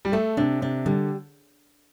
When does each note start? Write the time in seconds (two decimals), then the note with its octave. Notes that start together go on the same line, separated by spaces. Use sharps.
0.05 G3
0.12 A3 A4
0.37 C3 D4
0.61 C3 D4
0.85 D3 G3